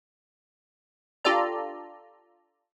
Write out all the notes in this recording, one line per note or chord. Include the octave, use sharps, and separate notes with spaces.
D4 F4 G4 A4 D5 A#5